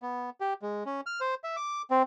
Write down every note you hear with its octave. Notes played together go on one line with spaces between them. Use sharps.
B3
G4
G#3
C#4
F6
C5
E5
D6
C4